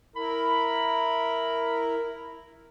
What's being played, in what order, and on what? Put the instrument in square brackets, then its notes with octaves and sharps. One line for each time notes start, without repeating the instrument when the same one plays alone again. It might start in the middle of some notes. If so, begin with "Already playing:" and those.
[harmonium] E4 A#4 [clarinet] B5